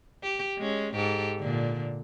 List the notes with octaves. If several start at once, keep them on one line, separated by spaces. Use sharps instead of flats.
G4
G#3 C#4
G#2 G4 A4
A#2 D3